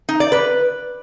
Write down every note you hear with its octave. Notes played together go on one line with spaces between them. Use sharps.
D#4
D5
B4